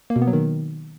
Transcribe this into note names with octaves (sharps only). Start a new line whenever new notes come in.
A#3
B2
B3
F#3
D#3